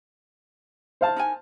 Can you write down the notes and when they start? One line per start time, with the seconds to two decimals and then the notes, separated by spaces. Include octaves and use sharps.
1.01 C5 F5 A5
1.16 D#4 A#4 G#5